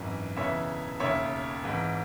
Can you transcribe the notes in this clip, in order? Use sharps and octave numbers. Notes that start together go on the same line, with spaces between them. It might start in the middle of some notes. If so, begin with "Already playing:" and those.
Already playing: G#1 F#2 E3
E1 E2 C#3 E3 C#5 E5
E1 D#2 C#3 C#5 E5
G#1 G#2 E3